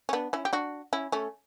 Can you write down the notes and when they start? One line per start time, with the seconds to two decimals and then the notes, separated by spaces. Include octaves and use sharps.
0.09 C#4
0.13 B3 D4
0.33 C#4 E4
0.45 G4
0.53 D4 F#4
0.93 C#4 E4
1.12 A3 C#4